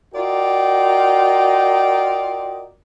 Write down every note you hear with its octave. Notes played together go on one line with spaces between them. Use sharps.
F4 F#4 A#4 D5 D#5 G5